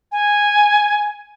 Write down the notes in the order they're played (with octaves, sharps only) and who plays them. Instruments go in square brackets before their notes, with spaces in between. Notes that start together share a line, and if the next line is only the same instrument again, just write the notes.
[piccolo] G#5